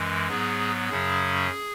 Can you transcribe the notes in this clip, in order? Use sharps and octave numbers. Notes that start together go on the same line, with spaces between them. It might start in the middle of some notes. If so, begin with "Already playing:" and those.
Already playing: F#2 E3 G#3
G#2 F#3 B3 G#4
F#2 C#3 F#3 C#4 G#4